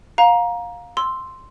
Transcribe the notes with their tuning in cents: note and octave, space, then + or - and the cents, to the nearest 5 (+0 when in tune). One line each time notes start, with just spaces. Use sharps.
F5 +25 A#5 +15
C6 +0 E6 +0